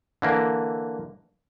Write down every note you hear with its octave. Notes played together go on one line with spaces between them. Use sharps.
D3 E3 A#3